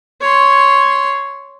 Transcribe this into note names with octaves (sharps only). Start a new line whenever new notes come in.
C#5 C6